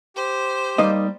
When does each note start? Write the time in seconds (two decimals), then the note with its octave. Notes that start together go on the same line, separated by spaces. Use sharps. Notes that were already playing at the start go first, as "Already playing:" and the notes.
0.16 G4 C5
0.78 G3 A#3 D#4 D#5